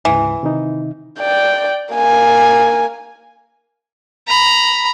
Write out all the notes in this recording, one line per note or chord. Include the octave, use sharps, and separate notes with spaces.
D2 G#2 C#3 E3
C3 D#3 D#4
D5 G5
A#3 G#5
A#5 B5